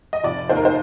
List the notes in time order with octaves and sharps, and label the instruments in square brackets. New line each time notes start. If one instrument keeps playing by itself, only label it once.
[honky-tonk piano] D#5
[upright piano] F1 [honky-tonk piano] D5
[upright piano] D#2 [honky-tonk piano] C5
[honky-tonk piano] A#4
C5